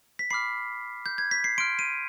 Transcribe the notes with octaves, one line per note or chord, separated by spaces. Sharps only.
B6
B5 D6 F6 C7
G6
G#6
B6
C7
C6 F6 D7
D#7